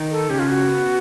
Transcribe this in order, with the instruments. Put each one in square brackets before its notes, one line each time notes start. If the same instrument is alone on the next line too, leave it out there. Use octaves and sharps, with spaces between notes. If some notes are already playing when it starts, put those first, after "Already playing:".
Already playing: [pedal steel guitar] D#3 D#4
[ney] A4
[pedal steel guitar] C#3 C#4 [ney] G4
[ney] F4
F#4
[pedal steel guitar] B3